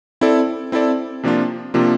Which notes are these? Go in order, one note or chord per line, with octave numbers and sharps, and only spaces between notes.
C4 E4 A4 D5
C4 E4 A4 D5
C3 F3 A#3 D4 F4
C3 F3 A#3 D4 F4